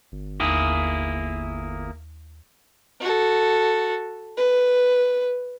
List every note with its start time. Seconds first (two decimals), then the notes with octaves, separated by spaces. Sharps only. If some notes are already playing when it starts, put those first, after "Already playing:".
0.12 G1
0.40 D#2 A#3 E4 G#4
3.01 F#4 A4
4.37 B4